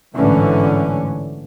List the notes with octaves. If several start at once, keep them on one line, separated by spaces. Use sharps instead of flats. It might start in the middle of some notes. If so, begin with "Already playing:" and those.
A1 G#2 D3 E3 C#4